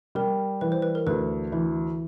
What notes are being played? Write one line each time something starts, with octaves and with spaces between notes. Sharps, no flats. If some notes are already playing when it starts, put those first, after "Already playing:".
G3 A#4
E3 B4
C5
B4
A#4
D2 B4
E3